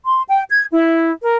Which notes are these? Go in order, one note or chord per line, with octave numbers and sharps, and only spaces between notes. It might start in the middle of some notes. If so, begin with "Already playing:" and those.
C6
G5
G#6
E4
A#4